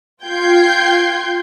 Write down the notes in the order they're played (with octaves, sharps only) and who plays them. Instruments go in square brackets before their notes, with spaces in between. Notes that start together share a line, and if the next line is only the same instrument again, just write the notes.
[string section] F4 G5 G6 G#6 C7